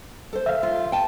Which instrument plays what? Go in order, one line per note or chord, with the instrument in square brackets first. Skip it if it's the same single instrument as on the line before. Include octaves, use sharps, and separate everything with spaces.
[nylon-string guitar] A4 C5
[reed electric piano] E5 F5
[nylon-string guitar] F4
G5 A5